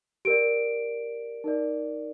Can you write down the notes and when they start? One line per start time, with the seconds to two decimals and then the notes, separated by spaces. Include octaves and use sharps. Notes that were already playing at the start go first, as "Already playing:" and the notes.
0.25 G4 A#4 D5 D7
1.44 D#4 A#4 D5